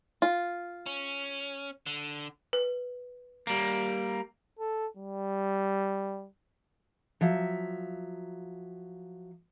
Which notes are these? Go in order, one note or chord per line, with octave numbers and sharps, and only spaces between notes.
F4
C#4
D3
B4
G3 A#3
A4
G3
F3 F#3 E5